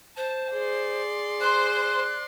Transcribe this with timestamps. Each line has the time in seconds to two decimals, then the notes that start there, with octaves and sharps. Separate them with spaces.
0.17 C5 A5
0.54 G#4 D5 C6
1.41 C5 F#6